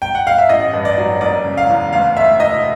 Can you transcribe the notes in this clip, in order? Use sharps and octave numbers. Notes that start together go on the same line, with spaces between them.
G5
F#5
F5
E5
A1 D#5
G2
D5
F#3
F#1 D5
C#3
F5
E2
D2 F5
D2 E5
E1 D#5